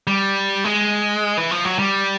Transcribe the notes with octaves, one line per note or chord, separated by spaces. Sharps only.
G3
G#3
E3
F3
F#3
G3